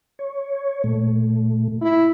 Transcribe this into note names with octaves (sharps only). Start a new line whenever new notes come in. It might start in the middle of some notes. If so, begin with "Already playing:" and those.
C#5
A#2 A3
E4